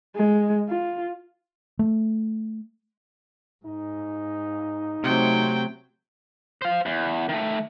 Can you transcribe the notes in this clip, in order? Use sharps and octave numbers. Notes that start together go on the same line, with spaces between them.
G#3
F4
A3
G#2 D#4
C3 F#3 A3 C4 G5
C5 F5
E2
D#3 A3